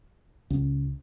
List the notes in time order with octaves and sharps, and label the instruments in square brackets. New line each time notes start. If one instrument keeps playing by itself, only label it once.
[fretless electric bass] C#2